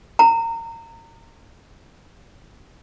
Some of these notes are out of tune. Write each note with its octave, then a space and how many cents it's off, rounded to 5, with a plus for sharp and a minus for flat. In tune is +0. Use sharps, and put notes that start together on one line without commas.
A#5 -25